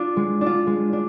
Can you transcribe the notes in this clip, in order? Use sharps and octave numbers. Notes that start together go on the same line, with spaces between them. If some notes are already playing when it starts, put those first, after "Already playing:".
Already playing: D4 F4
G#3
D4
F4
G#3
D4